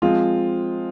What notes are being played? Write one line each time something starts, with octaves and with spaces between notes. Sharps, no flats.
F3 G#3 C4 F4